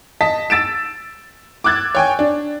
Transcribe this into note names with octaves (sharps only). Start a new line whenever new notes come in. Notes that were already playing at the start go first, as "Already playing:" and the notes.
D#5 A5 B6
E6 A6 D7 E7
D6 E6 F#6 G#6 A6
C#5 G5 G#5
D4